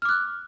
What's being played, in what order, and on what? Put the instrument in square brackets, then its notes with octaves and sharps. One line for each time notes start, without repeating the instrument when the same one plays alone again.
[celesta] F6
D6
F#6